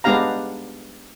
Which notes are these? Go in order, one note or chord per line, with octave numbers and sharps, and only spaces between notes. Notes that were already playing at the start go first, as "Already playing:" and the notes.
G#3 B3 D4 G4 F5 A#5